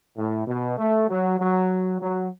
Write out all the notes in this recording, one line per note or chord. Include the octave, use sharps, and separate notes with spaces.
A2
B2
A3
F#3
F#3
F#3